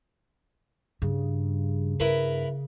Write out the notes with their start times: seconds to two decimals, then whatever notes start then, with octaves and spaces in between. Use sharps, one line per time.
1.02 G2 C#3
2.00 G2 E4 A#4 B4